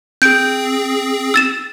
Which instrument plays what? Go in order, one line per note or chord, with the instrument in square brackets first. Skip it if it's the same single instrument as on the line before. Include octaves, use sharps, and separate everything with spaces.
[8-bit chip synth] C4 G#4 [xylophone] G6 D7
[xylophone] E6 A6 E7